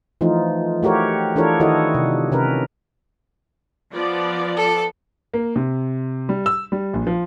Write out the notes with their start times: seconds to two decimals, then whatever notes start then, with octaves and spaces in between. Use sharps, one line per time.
0.21 E3 F3 A3 D#4 F4
0.83 A3 F#4 G4 A#4 C#5
1.36 E3 D4 F4 A4 A#4 C#5
1.60 D#3 E4 F#4 A4 C#5 D#5
1.95 C3
2.32 C3 C#4 A#4 B4
3.94 F3 B3 D5
4.57 A4
5.34 A#3
5.56 C3
6.29 G3
6.46 E6
6.72 G3
6.93 A#1
7.07 F3